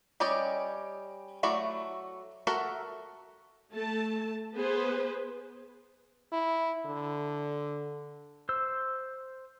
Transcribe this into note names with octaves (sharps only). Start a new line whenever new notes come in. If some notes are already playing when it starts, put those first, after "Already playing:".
G3 C#4 G4 D5 D#5
F#3 A3 E4 F#4 D5
F#4 A4 A#4 E5 F#5
A3 A5
B3 G#4 B4 C5
E4
D3
C5 E6